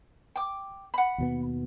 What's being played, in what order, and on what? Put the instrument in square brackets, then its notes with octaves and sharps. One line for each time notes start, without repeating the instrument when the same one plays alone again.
[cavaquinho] G5 D6
F#5 B5
[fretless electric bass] D#2 B2 B3